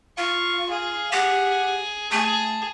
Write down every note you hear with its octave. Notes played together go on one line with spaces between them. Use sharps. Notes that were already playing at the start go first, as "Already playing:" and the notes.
F4 F5 C#6
G#4 F5
G4 F#5
A3 G#4 A5